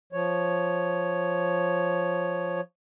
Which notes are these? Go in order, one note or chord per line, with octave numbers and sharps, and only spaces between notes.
F3 C#5